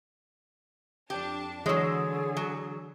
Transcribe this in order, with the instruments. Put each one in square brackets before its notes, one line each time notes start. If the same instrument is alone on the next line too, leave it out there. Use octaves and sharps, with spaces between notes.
[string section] F2 D4 A5 [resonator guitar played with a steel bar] G4
[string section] D3 [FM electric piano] E3 C#5 E6 [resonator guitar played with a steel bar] F#3 G#3 [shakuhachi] G#4
[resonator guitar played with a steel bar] F#3